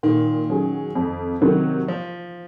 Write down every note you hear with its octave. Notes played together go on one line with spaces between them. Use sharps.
A#2 D#3
F#3 C#4 G#4
F2
C3 D#3 F#3
F3